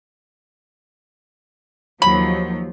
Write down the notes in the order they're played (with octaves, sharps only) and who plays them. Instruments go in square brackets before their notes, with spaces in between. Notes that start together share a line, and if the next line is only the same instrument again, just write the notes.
[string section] D#2 F3 F#3 [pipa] B5